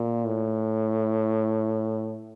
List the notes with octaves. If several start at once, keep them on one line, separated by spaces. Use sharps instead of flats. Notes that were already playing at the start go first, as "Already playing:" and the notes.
Already playing: A#2
A2